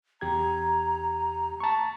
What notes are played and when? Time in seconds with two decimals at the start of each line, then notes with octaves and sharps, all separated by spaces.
0.21 E2 G4 A#5 G#6
1.60 A5 C#6